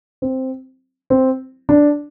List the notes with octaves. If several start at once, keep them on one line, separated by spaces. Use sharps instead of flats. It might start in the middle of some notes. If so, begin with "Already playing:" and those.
C4
C4
D4